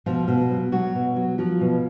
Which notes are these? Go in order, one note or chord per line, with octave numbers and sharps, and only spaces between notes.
B2 F3 F4
B2
F#3
B2 F#3 F#4
B2
F#3
F3 F#3 F4
B2